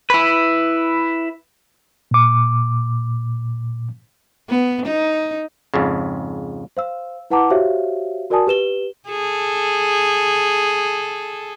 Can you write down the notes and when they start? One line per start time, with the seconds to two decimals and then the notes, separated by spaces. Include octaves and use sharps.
0.10 E4 B4
2.11 A#2 D6
4.49 B3
4.86 D#4
5.74 F2 G#2 C#3
6.77 C5 F5 E6
7.30 E4 B4 F#5 A5 A#5 D6
7.50 F#4 G4 C5 C#5 E5 F5
8.30 F#4 A#4 D5 G#5 A5 D#6
8.47 G4 B4 E7 G7
9.09 G#4 A4